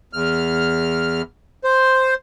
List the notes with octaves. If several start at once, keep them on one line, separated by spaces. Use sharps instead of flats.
E2 F6
C5